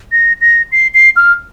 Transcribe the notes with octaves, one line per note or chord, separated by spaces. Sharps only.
A#6
A#6
C7
C7
F6